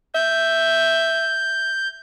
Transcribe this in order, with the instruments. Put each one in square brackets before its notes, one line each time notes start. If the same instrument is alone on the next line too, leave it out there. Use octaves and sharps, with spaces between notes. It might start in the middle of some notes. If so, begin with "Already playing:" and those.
[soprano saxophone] E5 [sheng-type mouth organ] G6